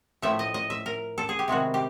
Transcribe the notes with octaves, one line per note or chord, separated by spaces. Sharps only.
A2 F3 A3 E5
D#5
D#5
E5
A#4
A4
G#4
G4
C3 D#3 G#3 B3 F#4
G4